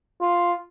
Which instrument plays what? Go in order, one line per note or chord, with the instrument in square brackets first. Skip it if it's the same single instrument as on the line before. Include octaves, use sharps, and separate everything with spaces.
[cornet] F4